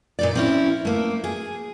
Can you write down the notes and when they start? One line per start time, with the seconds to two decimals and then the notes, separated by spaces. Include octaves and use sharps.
0.19 A#2 D#4 D5
0.35 C4 C#4 E4
0.85 A3 A#3
1.24 G#4